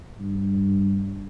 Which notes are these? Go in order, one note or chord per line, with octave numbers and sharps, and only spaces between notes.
G2